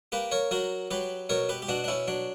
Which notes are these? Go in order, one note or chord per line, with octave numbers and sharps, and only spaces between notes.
A#3 G4 B4
A#4 C#5
F#3 F#4 A#4
F#3 G4 B4
B2 A#4 C#5
G4 B4
G4
B2 D4 F#4
D4
C#4 E4
F#3 D4